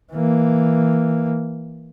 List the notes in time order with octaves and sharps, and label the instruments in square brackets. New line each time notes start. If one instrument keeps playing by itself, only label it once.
[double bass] E3 A#3